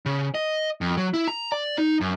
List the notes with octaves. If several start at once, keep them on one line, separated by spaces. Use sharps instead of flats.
C#3
D#5
F2
F#3
E4
A#5
D5
D#4
F#2